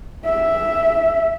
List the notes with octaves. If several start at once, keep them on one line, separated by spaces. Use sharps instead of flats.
E5